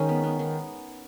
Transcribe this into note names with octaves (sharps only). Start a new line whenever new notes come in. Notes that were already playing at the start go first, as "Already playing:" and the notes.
Already playing: D#3 G#3 C#4 D#4
B3
B3
D#3